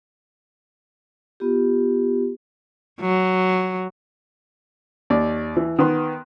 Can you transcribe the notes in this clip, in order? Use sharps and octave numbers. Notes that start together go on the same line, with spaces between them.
B3 F4 G4
F#3
D#2 D5
E3
D#3 B3 C6